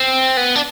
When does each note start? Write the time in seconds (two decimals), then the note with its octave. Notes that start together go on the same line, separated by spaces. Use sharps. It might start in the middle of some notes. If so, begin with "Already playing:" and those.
Already playing: C4
0.37 B3
0.56 D4